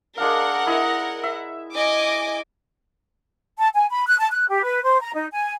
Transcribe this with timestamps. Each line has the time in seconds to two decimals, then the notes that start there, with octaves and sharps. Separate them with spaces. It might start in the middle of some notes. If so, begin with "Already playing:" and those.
0.18 G#3 D4 A#4 F5 F#5
0.66 E4 D#5 E5
1.23 E5
1.73 D#5 G#5 D6
3.58 A5
3.74 G#5
3.91 B5
4.07 F#6
4.19 A5
4.31 F#6
4.49 G4
4.63 B4
4.83 C5
5.01 A#5
5.14 D#4
5.32 G#5